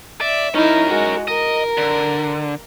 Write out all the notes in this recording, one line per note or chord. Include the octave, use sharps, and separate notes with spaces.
D5 E5
C#4 D#4 E4 A#4
G#3 F#4
A#4 D#5
D3